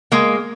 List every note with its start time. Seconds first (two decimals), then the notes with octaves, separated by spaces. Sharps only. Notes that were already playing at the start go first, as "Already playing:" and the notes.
0.12 G#3 A#3